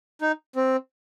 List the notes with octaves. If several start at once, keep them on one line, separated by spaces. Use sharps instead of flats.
D#4
C4